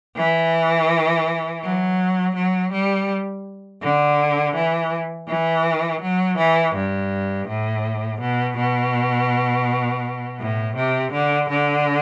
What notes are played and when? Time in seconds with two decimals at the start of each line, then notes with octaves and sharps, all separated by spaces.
0.17 E3
1.63 F#3
2.35 F#3
2.72 G3
3.82 D3
4.55 E3
5.29 E3
6.01 F#3
6.38 E3
6.75 G2
7.48 A2
8.21 B2
8.57 B2
10.39 A2
10.76 C3
11.13 D3
11.50 D3